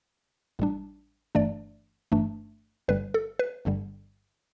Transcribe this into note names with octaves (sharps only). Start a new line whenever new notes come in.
A1 A2 G3 D4
G1 G2 E3 A3 D4 D5
G1 G2 E3 A3 D4
G1 G2 D3 G3 B4
A4
B4
G1 G2 D3 G3